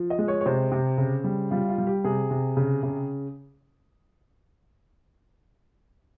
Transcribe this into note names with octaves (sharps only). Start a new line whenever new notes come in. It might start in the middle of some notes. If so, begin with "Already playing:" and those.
Already playing: F3
D#5
G#3
C#5
C#5
C3 C5
C3
C#3
G3
G3 F4
F4
G3
G4
C3 G#4
C3
C#3
C#3